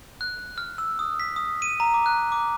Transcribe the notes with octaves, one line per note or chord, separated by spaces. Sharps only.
F#6
F6
E6
D#6
B6
D#6
D#7
A#5
D6
F#6
D6